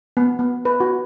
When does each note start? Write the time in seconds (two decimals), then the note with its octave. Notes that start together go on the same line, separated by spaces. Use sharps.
0.17 B3
0.39 B3
0.65 B4
0.80 F#4